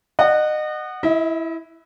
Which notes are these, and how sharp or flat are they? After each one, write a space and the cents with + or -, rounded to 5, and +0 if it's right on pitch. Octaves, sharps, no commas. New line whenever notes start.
D#5 -30 F#5 +0
E4 +0 D#5 +45